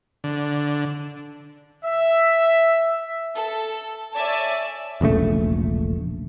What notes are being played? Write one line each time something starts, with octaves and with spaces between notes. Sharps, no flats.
D3
E5
A4
C#5 D5 E5 G#5 A5
E1 A#1 C#3 A3